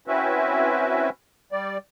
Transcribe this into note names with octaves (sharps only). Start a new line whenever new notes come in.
C4 C#4 E4 F#4 B4 E5
G3 D5